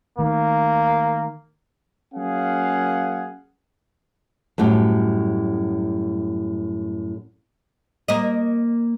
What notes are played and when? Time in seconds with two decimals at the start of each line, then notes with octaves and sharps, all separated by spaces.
0.19 D#3 A3 A#3
2.15 F#3 A#3 C#4 G#4 F5 F#5
4.58 F#2 A2 G3
8.08 A#3 D#5